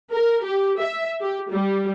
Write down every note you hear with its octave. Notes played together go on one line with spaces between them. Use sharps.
A#4
G4
E5
G4
G3